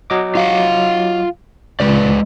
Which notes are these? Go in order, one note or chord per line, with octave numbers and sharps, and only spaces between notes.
F#3 D#5 D6
F4 F5 F#5
C#2 G#3 B4 D5